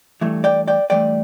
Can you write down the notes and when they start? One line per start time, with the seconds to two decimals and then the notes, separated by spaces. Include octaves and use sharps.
0.21 G2 E3 A3
0.44 D5 G5
0.68 D5 G5
0.90 G2 E3 A3 D5 G5